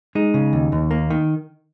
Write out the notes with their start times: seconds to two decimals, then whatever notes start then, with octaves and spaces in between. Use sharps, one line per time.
0.15 G#3 D#4
0.34 C#3
0.53 D#2
0.72 D#2
0.91 A#3
1.10 D#3